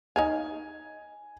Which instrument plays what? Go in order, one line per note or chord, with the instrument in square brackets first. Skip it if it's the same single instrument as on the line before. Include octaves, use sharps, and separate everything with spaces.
[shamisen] D#4 C#5 F5 [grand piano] G#5